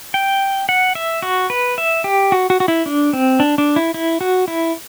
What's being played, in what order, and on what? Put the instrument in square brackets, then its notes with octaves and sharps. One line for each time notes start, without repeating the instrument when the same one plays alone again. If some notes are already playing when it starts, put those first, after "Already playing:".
[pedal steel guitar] G5
F#5
E5
F#4
B4
E5
G4
F#4
F#4
F#4
E4
D4
C4
D4
D4
E4
E4
F#4
E4